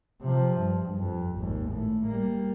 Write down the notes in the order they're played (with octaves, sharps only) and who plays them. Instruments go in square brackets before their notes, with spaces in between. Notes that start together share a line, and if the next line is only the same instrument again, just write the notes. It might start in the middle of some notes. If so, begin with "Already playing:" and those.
[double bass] C3 F3
G2
F2
G#1 D#2
A2
G3 A#3